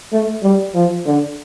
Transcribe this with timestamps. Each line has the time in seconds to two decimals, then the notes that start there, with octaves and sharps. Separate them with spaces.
0.12 A3
0.43 G3
0.74 F3
1.06 D3